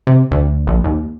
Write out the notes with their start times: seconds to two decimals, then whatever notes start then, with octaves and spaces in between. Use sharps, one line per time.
0.07 C3
0.31 D2
0.67 A#1
0.84 D#2